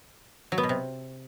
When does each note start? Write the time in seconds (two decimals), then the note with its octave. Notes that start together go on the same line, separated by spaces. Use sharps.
0.52 F#3
0.58 B3
0.63 B2
0.69 C3